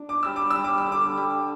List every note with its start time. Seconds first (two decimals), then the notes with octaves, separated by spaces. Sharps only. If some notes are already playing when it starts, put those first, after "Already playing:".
Already playing: D4
0.09 D6
0.23 G3 E6
0.36 D6
0.50 G3 E6
0.64 D6
0.78 E6
0.87 D3
0.92 D6
1.18 G3